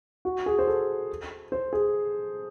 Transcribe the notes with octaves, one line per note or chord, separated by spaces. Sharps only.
F#4
G#4
C5
A4
C5
G#4